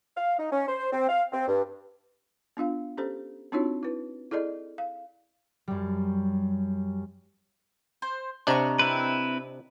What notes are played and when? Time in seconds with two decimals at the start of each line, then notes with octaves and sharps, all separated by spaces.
0.16 F5
0.38 D#4
0.51 C#4
0.68 C5
0.92 C4
1.08 F5
1.32 C4
1.48 G2
2.57 B3 D4 F4 F5
2.97 C#4 G4 A4 C5
3.52 C4 D4 D#4 F4 F#4 C#5
3.83 E4 B4
4.31 E4 G#4 A4 D5 D#5
4.78 F5
5.68 F#2 G3
8.02 C5
8.47 C3 D4 D#5 A#5 C#6
8.79 C4 E4 B4